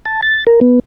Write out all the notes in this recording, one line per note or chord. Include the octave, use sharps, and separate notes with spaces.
A5
A6
A#4
B3